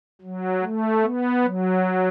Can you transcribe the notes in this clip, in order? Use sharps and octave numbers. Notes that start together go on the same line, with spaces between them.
F#3
A3
B3
F#3